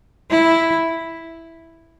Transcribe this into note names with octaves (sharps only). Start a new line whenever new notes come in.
E4